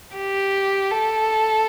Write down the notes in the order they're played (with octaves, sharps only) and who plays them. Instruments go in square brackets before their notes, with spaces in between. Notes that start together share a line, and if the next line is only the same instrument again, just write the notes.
[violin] G4
A4